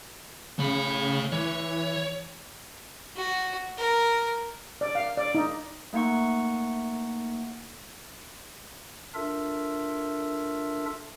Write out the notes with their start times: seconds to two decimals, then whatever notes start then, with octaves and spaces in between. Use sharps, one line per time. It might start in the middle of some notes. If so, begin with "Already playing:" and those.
0.58 C#3 A3 B5
1.32 E3 C#5
3.16 F#4
3.77 A#4
4.81 D5
4.95 F5
5.17 D5
5.35 D#4
5.93 A3 A#3 D#4 F#5 C#6
9.14 D4 F4 A4 A#4 E5